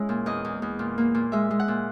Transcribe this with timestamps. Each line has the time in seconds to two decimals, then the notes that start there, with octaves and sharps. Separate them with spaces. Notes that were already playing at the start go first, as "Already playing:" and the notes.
Already playing: G#3 C#4 E4
0.09 A#2
0.26 E2 D#5
0.45 E2
0.62 E2
0.79 A#2
0.98 A#3
1.14 A#2
1.32 G#3 E5
1.51 G#3
1.60 F#5
1.68 A#2